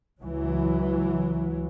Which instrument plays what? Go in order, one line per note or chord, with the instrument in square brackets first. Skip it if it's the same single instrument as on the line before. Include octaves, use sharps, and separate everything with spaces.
[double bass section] C#2 E3 F#3